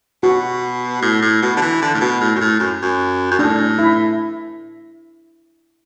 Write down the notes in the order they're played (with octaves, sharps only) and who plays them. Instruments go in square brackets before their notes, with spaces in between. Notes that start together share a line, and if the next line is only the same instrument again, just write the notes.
[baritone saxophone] B2 [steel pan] F#4
[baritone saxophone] A2
A2
B2
D3
E3
D3
A2
B2
A2
F#2
A2
F#2
F#2
F#2
[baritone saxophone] A2 [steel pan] D4
[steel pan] E4